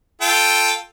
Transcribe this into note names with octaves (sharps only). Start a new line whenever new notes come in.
F4 A4 G5